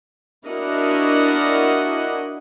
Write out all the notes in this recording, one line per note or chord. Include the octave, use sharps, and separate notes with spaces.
D4 E4 F#4 A#4 D#5 F#5